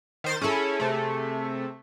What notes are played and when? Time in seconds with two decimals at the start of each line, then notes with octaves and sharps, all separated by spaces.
0.24 D#3 C5 A6
0.41 C#4 E4 G#4 A4
0.80 C3 A3